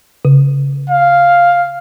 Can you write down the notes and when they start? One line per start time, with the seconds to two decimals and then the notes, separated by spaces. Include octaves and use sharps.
0.25 C#3
0.90 F5